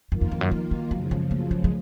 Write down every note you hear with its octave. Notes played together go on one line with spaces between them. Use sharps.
F#2 D#3 A#3 F4
F2
F2
F#2
F3
F#3
F#2 C#3 F3 F#3
G#3
A#3
G#3
G#3